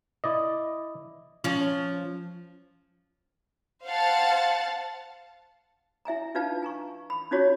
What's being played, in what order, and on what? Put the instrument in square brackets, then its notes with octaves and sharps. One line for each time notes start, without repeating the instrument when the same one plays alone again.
[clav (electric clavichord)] E4 D5 D#5
[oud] F3 C#4
[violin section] C5 F5 F#5 A5
[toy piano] E4 E5 G#5 A#5
D4 D#4 F4 B4 F5 A5
G#5 A#5 C#6
B5
C#4 D#4 F4 F#4 C#5 C#6